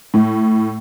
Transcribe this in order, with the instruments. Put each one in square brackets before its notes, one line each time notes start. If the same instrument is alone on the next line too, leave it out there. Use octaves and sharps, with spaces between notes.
[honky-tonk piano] A2